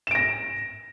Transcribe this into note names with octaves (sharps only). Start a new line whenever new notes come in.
A#6 D7 E7